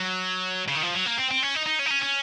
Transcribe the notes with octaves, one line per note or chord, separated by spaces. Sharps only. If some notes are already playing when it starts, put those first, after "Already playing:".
Already playing: F#3
C#3
D#3
F3
F#3
A#3
C4
C4
C#4
D#4
D#4
C#4
D#4
C#4
C#4